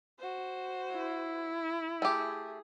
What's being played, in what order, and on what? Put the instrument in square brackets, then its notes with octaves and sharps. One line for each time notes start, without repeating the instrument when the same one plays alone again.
[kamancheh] F#4 C5
[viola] E4
[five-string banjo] A3 G4 [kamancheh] G#4